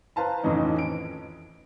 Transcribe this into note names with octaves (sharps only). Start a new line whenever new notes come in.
B4 C5 F5 A5 A#5
F2 A2 D#3 E3 C#4 D#4
D7